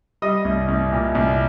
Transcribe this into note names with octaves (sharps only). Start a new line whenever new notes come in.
G3 D#5 D#6
C2
C2
A#2
C2